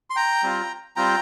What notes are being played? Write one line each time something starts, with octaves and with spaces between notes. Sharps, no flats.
C6
G5 A#5
G3 C4 F4
G3 C4 F4 G5 A#5